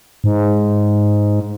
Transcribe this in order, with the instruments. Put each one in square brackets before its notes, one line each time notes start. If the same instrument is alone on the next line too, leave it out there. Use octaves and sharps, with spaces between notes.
[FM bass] G#2